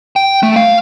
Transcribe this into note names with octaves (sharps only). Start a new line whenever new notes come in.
G5
A3
F5